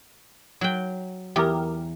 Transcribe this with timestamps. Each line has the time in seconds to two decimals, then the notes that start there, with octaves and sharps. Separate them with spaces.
0.61 F#3 G5
1.36 E2 G4 A#4